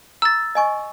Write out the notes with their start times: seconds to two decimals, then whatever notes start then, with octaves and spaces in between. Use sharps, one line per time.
0.22 A#5 E6 A6
0.55 D#5 G#5 C#6